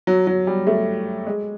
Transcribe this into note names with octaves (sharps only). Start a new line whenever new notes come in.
F#3
F#3
G3
A3
G#3